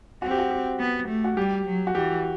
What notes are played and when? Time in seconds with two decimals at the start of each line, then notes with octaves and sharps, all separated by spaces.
0.22 C4 F#4
0.31 G4
0.39 F#4
0.51 G4
0.79 B3
1.08 A3
1.24 F#4
1.37 G3 G4
1.66 F#3
1.87 F#4
1.95 E3 G4